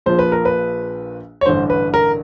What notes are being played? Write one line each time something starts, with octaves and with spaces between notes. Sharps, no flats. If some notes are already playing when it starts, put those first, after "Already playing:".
A#1 A#2 F3 C5
B4
A#4
B4
C#5
A1 G2 D3 C5
B4
A#4